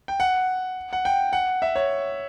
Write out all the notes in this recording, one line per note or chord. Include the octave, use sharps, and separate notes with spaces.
G5
F#5
F#5
G5
F#5
E5
C#5